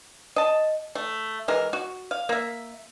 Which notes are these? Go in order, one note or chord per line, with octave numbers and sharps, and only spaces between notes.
D#5 A5
A3
E3 G#3 A#4
F#4
F5
A#3 E5